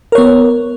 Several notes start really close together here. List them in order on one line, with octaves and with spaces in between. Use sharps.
A#4 C#5 B3